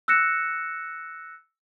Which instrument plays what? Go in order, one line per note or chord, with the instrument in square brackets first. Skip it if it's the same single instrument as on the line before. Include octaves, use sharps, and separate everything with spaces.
[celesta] E6 F#6 A#6 C#7 E7